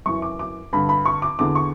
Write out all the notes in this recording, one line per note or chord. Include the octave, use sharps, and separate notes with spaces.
F#2 E3 C#6
D6
D6
G2 D3 B5
B5
C#6
D6
E2 D3 D6
C#6